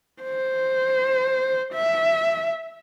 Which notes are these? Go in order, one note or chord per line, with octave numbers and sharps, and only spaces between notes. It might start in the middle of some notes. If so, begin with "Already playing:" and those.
C5
E5